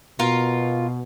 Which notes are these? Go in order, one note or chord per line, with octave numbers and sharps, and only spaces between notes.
B2 F4 A#4